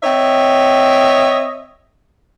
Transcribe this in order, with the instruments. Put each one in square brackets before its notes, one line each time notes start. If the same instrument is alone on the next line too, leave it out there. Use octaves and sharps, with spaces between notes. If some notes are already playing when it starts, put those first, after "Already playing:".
[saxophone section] C4 C#5 D#5 E5